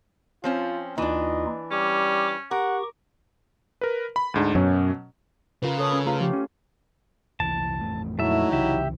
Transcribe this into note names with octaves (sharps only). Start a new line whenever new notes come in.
F3 C4 C#4 F4
D#2 E3 D4 D#4 F4 D#5
G3 C#4 D6
G4 A#4 F#5 C#6
A#4 B4
B5
D2 G#2 D4
F#2 B2 F#3 C#4
C#3 F4 A#4 B4
A4 C#5 D#6
C#4 G#4 B4
A3 F4 G#4 B4 A#5
F3 G4
C#4
F1 C2 E3 A5
A1 F2 A3
F2 A#2 F#3 A3 D#4 E4 E5
C2 C#3 E3 G4 E5